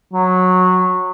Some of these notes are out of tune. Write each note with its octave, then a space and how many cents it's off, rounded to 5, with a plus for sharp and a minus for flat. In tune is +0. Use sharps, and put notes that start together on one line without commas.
F#3 -15